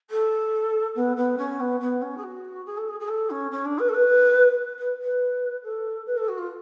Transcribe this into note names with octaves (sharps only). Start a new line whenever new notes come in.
A4
B3
B3
C#4
B3
B3
C#4
G#4
F#4
G#4
A4
G#4
G#4
A4
C#4
C#4
D4
B4
A4
B4
B4
B4
A4
B4
A4
F#4
F4